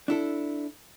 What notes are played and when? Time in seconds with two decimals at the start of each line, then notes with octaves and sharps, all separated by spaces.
0.08 D4 E4 A4